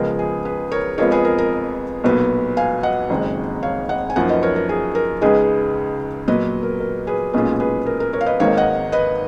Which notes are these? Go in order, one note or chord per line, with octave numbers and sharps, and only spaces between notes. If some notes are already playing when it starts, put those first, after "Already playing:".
Already playing: C#2 C#3 F3 G#3 B3 A#4
G#4
G#4 B4
A#4 C#5
F2 F3 G#3 B3 F4 A#4 C#5
G#4 B4
A#4
A#4
B1 A#2 F#3 B3
F5 G#5
D#5 F#5
F#1 F2 D#3 G#3
C#5 F5
D#5 F#5
G#5
F#2 F3 A#3 D#4 D#5 F#5
B4 D#5
A#4 C#5
A#4
G#4
A#4
C#2 C#3 G#3 D#4 G#4 B4
A#2 F#3 B3 B4 D#5
A#4
A#4
G#4 B4
B1 A#2 G#3 C#4 F4 G#4 B4
G#4 B4
A#4
A#4
A#4 C#5
F5
B4 D#5
G#1 G#2 D#3 A#3 C#5 F5
D#5 F#5
B4 D#5